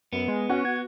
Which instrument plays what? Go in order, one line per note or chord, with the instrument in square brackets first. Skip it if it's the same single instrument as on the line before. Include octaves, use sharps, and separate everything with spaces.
[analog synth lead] F#2 [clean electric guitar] B3
[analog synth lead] G#3
[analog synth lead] C#4 [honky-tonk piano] F#4
[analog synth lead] G#6